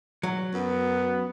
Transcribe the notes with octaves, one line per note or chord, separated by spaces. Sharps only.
F#3
F#2 B3